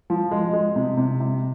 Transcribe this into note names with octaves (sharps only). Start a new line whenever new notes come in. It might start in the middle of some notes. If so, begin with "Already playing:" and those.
F3
G#3
G#3
C3
C3
C3